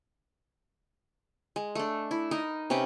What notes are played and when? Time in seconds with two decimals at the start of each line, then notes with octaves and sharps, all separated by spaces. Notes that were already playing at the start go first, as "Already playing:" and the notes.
1.56 G#3
1.75 A3 D4
2.11 E4
2.31 D#4 A#4 D#5
2.70 C3 C#4 B4 G5